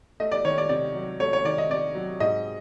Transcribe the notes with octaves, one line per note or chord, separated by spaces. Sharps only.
A3 D#5
D5
D#3 C#5
D5
C3 D5
F#3
A3 C#5
C#5
D#3 D5
D#5
C3 D5
F#3
G#2 D#5